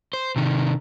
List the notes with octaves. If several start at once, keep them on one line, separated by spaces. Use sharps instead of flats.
C5
C3 D#3